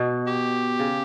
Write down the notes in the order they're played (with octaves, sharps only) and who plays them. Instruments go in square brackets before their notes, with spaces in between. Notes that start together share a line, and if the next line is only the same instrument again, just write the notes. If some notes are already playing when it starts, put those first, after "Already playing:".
Already playing: [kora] B2
[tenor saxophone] G4
[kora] C#3